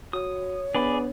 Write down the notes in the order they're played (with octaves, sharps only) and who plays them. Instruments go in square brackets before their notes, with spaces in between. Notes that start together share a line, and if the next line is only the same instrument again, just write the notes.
[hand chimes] F#4 [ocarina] C#5 [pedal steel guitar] D#6
[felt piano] B3 [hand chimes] D4 [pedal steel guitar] G#4 D5 B5